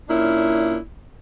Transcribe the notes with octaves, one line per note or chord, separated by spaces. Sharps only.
A#2 C#4 D4 E4